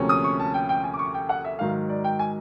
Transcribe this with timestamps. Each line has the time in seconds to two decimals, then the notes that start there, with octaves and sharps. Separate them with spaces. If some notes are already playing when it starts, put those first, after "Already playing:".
Already playing: D2 C3 F3 A#3 C#4
0.09 D#6
0.24 C#6
0.39 A5
0.54 G5
0.69 G5
0.84 G#5
0.94 D6
0.99 C#6
1.14 G5
1.29 F#5
1.44 E5
1.59 G#2 D#3 F#3 F5
1.89 D5
2.04 G5
2.19 G#5